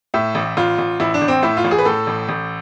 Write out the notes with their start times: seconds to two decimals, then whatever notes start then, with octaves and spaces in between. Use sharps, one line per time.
0.14 A2 E5
0.35 A1
0.57 A1 F4
0.78 A1
1.00 A1 E4
1.14 D4
1.21 A1
1.28 C4
1.42 A2 E4
1.57 F4
1.64 A1
1.71 G#4
1.78 B4
1.85 A2 A4
2.07 A1
2.29 A1